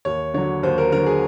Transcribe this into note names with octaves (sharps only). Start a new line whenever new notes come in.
D#2 C#5
D3 F#3 C#5
D#2 C5
A#4
D3 F#3 A#4
G#4